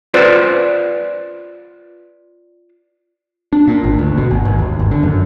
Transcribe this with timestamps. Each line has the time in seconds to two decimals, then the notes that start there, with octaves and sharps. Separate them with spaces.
0.14 F4 B4 C5 D5
3.53 D4
3.67 A#2
3.84 G#1
3.99 D2
4.18 B2
4.31 G#1
4.45 G#1
4.59 D#2
4.79 G1
4.91 D3
5.03 F#2